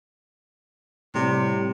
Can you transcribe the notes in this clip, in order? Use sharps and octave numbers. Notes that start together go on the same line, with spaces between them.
A2 C3 G3